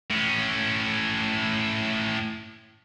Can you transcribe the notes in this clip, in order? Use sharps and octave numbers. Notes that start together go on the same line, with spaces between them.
A2 C#4